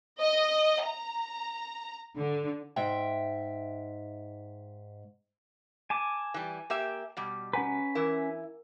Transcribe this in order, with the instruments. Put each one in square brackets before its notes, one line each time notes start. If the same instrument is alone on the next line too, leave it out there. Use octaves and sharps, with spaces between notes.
[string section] D#5
A#5
D3
[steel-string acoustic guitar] G#2 E5 G5
[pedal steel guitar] G#5 A5 D6
[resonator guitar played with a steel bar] E3 G3
A#3 G4 E5
B2 G3
[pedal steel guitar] C#4 B4 [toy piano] F#5 G#5 A#5
[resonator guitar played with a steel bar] E3 E4 [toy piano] A#4 E6